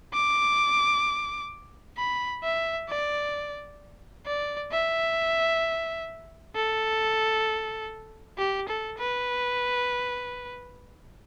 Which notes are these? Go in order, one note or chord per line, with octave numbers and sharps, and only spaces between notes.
D6
B5
E5
D5
D5
E5
A4
G4
A4
B4